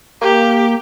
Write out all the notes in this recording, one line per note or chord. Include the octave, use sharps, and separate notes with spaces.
A#3 G4